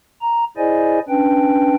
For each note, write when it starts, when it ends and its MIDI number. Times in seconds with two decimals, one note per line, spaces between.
0.21 0.44 82
0.57 0.99 64
0.57 0.99 68
0.57 0.99 72
0.57 0.99 74
0.57 0.99 75
0.57 0.99 80
1.09 1.75 61
1.09 1.75 62
1.09 1.75 71
1.09 1.75 79